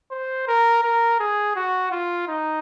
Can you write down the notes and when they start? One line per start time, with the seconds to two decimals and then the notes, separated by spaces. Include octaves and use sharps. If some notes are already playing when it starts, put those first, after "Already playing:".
0.11 C5
0.47 A#4
0.84 A#4
1.20 G#4
1.56 F#4
1.92 F4
2.28 D#4